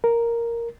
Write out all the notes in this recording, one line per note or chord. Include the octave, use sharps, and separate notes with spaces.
A#4